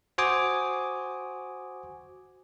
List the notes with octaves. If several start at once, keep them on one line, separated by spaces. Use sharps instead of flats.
F#4 C5 G#5 D6 D#6